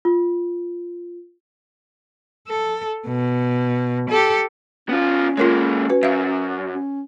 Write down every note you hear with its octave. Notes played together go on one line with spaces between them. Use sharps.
F4
A4
B2
G4 A4
B3 C#4 F4
G#3 A#3 F4 A#4 C#5
F#4 B4
F#2 E5 F5
C#4